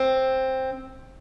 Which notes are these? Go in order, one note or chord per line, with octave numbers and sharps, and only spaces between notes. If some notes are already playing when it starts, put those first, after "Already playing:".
Already playing: C4